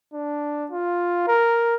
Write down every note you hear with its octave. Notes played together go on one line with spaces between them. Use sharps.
D4
F4
A#4